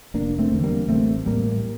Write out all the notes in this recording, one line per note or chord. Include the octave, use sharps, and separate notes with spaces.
F1 A#3 D4
A3 C4
E2 D3
G3 A#3
A1 A3 C4
A2 G3 A#3